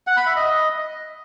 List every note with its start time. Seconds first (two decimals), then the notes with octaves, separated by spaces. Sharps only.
0.07 F#5
0.17 B5
0.26 E5
0.36 D#5